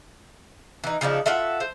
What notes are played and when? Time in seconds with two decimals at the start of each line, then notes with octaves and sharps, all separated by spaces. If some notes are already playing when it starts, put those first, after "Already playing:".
0.84 E3 D#4
1.01 C#3 F3 D4 D#4
1.26 F4 F#4 A4 E5
1.60 C5